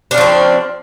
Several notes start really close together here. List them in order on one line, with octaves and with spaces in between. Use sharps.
D4 C#3 F3 C4